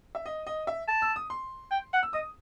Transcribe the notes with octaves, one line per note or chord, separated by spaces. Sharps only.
E5
D#5
D#5
E5
A5
E6
D#6
C6
G5
F#5
E6
D#5 D#6